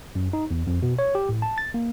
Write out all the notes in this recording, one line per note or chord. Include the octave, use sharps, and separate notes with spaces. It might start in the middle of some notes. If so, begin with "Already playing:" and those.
F#2
D#4
E2
F2
B2
C#5
G4
A2
A5
A6
A#3